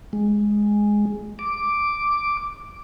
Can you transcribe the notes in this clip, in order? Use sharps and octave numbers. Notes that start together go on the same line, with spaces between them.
G#3
D6